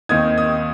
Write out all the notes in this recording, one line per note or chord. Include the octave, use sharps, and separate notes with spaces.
D#2 D#3 C4 D#4 D#6 G#6
D#6 G#6